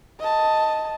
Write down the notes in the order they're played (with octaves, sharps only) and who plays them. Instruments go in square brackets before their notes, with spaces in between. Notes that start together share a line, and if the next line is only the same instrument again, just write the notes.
[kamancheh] D#5 A5